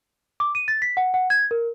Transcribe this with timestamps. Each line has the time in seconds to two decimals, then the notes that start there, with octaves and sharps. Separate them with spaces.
0.40 D6
0.55 D#7
0.68 A6
0.82 B6
0.97 F#5
1.14 F#5
1.30 G#6
1.51 A#4